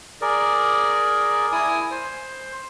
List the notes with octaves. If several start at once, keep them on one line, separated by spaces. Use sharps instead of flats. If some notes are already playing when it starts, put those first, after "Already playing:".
G#4 A#4 D5
E4 G#5 D#6
C5